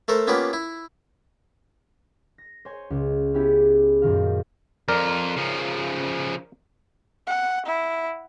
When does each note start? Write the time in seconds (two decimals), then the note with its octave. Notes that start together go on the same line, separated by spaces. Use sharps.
0.08 A3 A4 A#4 C5
0.27 A#3 B3 C#4 F4 G4 B4
0.53 E4
2.38 A#6
2.65 C5 C#5 G#5
2.90 C#2
3.34 B3 C#4 E4 G4 G#4
4.02 F#2 A#2 D#3 F5
4.88 F2 F4 A#4 D5
5.36 C#3 F3
7.27 F#5
7.66 E4